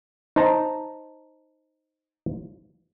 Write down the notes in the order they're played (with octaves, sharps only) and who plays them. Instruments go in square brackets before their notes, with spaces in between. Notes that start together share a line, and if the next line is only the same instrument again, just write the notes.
[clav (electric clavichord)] D#4 C5 A5 A#5